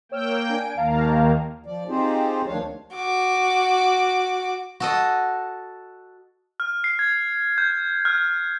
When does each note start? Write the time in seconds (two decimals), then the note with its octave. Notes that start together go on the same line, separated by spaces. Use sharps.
0.12 A#3 C#5 G5 E6 F6
0.45 D4 G#5 D7
0.77 D#2 D#3 A#3 F5 A5 A#5
1.65 F3 D5
1.88 C4 D#4 F4 G4 G#4 C5
2.47 D2 D#3 F3 D4 C#5 F5
2.94 F#4 D6
4.80 F#4 A4 D#5
6.60 F6
6.84 C7
6.99 G#6
7.58 G6
8.05 F6
8.18 F6